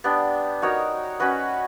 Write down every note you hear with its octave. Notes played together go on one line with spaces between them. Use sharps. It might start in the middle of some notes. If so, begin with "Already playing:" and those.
B3 D4 G4
D#4 F#4 A#4 C#5
C#4 F#4 B4